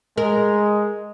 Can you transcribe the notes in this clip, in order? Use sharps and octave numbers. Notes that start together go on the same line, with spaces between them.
G#3 A#4